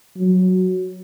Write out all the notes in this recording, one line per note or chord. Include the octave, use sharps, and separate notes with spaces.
F#3